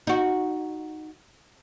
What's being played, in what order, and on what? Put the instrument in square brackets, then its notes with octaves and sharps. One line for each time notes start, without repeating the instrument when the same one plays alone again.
[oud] D#4 F#4